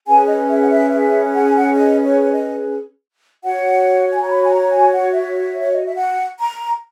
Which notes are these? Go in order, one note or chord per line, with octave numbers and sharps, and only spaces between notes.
C#4 G#4 B4 G#5
D#5
E5
F#5
E5
E5
F#5
G#5
F#5
D#5
C#5
C#5
D#5
F#4 C#5 F#5
G#5
A#5
B5
G#5
A#5
G#5
F#5
E5
C#5
D#5
E5
F#5
A#5